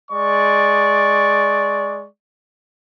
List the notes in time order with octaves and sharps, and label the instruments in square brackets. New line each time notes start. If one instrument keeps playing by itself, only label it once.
[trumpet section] G#3 D5 C#6